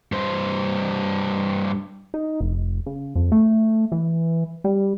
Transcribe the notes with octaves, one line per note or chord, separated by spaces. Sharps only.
G2 C5
D#4
F1
C#3
F2
A3
E3
G3